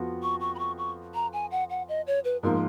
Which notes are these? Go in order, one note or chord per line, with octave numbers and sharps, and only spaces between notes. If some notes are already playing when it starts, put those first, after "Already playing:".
Already playing: F2 F3 B3 F#4
C#6
C#6
B5
C#6
C#6
A#5
G#5
F#5
F#5
D#5
C#5
B4
G#2 F3 A#3 A#4